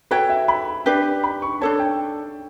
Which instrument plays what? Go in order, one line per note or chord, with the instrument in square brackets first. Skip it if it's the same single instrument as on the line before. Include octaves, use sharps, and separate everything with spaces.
[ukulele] F#4 A4 C#5 G5 [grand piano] B4
[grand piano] E5
B5
[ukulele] D4 G4 B4
[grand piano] B5
C#6
[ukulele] D4 A4 C#5 [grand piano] A5
[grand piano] G5